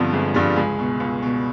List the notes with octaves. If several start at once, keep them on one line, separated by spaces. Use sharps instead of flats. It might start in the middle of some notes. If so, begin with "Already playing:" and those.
Already playing: G1 G2 D3 F3 B3 C4
G1 G#3
G2 D3 F3 G3
C#2 G#3
B2
C#2
B2